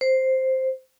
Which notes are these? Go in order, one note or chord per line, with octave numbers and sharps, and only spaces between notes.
C5